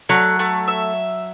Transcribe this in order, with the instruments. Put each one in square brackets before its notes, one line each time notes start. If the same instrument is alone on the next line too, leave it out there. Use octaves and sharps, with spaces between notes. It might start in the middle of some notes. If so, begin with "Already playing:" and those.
[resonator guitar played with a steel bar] F#3 [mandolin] A3
[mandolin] A3
E5